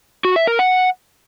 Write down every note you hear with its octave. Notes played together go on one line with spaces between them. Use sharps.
F#4
E5
A#4
F#5